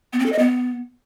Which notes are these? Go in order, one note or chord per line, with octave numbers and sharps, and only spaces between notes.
B3
C4
A4
D#5
B3